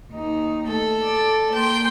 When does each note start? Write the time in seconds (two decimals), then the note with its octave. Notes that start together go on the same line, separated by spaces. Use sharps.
0.11 D#2 D#4
0.68 A3 A4
1.03 D5
1.54 A#3 G5 C6